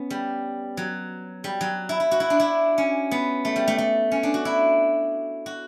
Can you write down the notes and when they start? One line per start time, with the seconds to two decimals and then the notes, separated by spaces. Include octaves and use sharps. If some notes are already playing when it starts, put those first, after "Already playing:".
Already playing: B3 C#4
0.10 G3
0.77 F#3
1.44 G3
1.61 F#3
1.89 E4
2.00 E4
2.11 F#4
2.20 E4
2.30 D4
2.40 E4
2.78 C#4
3.11 B3
3.45 A3
3.56 G3
3.68 A3
3.78 A3
4.12 C#4
4.23 D4
4.34 F#4
4.45 E4
5.46 F#4